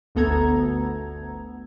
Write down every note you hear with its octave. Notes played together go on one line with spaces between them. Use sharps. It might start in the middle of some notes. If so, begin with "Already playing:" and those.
G1 D2 B3 A4 A#5 G#6